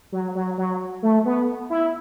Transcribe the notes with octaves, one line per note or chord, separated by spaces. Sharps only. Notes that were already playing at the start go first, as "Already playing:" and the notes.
F#3
F#3
F#3
A3
B3
E4